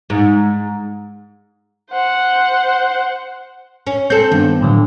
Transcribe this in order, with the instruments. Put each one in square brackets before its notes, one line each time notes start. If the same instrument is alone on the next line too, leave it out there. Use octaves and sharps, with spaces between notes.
[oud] G#2
[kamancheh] C5 F#5
[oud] C#4
[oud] C4 A4 [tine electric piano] G6
[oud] G2 [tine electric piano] D#3 B3
[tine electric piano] A2 D3 F#3